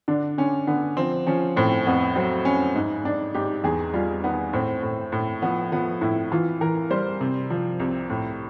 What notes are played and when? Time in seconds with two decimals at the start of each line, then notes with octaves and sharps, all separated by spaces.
0.08 D3 D4
0.38 D3 C#4
0.67 D3 B3
0.97 F3 C4
1.27 F3 C#4
1.56 A2 C4
1.87 F2 B3
2.16 F#3 C4
2.45 F2 C#4
2.75 G#2
3.04 G#2 D4
3.34 G#2 G4
3.64 E2 G#4
3.93 G3 F4
4.23 D#3 B3
4.53 A2 C4
4.83 A2
5.12 A2
5.42 F3 B3
5.72 F3 B3
6.01 A2 E4
6.32 E3 F4
6.61 E3 A#4
6.90 G3 C5
7.21 C3
7.50 F3
7.80 C2
8.10 A2